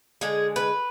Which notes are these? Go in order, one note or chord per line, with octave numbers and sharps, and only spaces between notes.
D3 G#3 G#4
B4